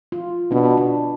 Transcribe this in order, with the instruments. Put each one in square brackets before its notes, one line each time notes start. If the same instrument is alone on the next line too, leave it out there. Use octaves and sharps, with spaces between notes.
[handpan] F4
[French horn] B2 [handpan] D4
[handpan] D4